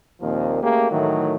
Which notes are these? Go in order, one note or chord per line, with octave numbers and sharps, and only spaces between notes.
D#2 A#2 F3 A#3 C4
A3 A#3 C#4 G4 G#4
A2 D#3 E3 F#3 A3